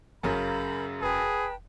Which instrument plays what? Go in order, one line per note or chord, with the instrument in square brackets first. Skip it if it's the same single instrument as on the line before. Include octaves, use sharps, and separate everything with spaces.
[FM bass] G1 [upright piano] F#2 C#3 C#4 [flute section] A#4 B5 G6
[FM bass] E1 [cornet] G#4 [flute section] B4 G5 A5